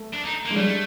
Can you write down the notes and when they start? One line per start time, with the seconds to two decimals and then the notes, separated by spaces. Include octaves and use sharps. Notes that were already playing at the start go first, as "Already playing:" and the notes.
Already playing: A3
0.14 D4
0.25 D#4
0.46 A#3
0.50 G#3
0.56 G3 A3